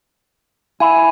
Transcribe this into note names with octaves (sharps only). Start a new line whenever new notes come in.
E4 G#5